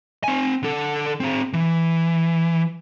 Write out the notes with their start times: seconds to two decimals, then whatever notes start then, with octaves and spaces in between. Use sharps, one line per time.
0.24 C4 G#5
0.63 D3 A4
1.20 C4 G#4
1.53 E3